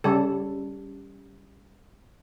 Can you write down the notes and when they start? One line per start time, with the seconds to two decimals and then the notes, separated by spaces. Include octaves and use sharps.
0.04 C#3 G3 A4